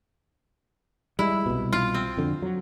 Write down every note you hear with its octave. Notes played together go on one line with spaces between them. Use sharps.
G3 G#3 E4
C2 B2
F4
C4
F2 D3
F#3